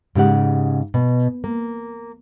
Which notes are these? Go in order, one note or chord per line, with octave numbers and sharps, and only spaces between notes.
G#2 C#3 G4 F#5
B2
A#3